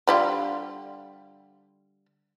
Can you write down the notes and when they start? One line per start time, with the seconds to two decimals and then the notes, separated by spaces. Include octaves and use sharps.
0.07 D3 G3 F4